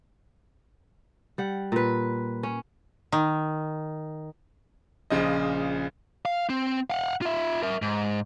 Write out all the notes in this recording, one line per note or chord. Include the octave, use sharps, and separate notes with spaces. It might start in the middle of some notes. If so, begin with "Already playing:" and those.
G3 F#5
A#2 B4
C#4
D#3
A#1 C#3 F3 D#5
F5
C4
F5 F#5
F4 E5
A#4 E5
G#2